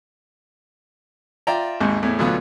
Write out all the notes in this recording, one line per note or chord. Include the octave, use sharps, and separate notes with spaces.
F4 D5 E5 G5 A#5
G#1 D#2 G#2
E2 A2
D2 B2 D3 F#3 B3 F4